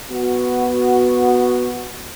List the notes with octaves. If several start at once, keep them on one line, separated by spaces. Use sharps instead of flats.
B3 F#4